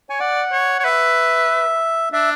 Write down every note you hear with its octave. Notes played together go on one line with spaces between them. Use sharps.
C#5 G#5
D5 F#5
C#5
C#5
B4 E5
D4 E5